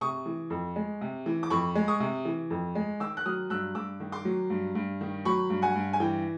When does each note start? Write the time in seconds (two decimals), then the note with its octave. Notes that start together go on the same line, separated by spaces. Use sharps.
0.01 C3 C#6 D#6
0.26 E3
0.50 F2
0.76 G#3
1.01 C3
1.26 E3
1.43 D6
1.50 F2 B5 C#6
1.75 G#3
1.88 C#6 D#6
2.00 C3
2.25 E3
2.50 F2
2.75 G#3
3.00 D#3 D6 E6
3.17 F#6
3.26 F#3 D#6 F6
3.50 G2 E6 F#6
3.75 G2 D6 E6
4.00 D#3
4.12 C6 D6
4.25 F#3
4.50 G2
4.75 G2
5.01 D#3
5.25 F#3 B5 C#6
5.50 G2
5.62 F#5 G#5
5.75 G2
5.93 G#5
6.00 E3 G5